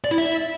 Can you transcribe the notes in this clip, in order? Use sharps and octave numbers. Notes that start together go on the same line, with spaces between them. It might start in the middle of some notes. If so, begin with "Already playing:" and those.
D5
E4
E5